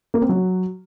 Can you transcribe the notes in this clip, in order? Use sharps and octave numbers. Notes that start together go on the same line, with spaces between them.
A#3
C4
F#3